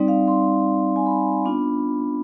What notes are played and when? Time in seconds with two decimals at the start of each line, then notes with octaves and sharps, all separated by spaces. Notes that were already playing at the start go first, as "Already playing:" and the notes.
Already playing: G3 C4 D#4 D5
0.08 F5
0.28 C6
0.96 G#5
1.06 B5
1.45 B3 D4 F4